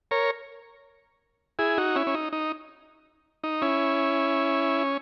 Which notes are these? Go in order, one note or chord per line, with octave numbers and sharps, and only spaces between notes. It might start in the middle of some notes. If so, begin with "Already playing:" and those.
A#4 C#5
E4 G#4
D#4 F#4
C#4 E4
C#4
D#4
D#4
D#4
C#4 E4